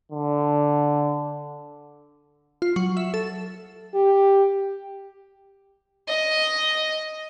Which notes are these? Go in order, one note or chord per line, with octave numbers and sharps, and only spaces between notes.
D3
F4
F#3
E5
A4
G4
D#5